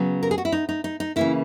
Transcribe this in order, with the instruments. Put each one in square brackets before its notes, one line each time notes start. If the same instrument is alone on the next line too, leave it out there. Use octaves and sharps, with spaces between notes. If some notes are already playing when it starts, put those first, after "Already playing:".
Already playing: [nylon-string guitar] C#3 F#3 B3
A#4
G#4
F#4
E4
D#4
D#4
D#4
D#4
C#3 E3 A#3 E4